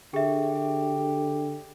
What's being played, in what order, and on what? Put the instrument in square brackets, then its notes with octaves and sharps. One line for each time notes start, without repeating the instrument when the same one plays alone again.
[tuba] D3 [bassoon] G4 [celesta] G#4 E5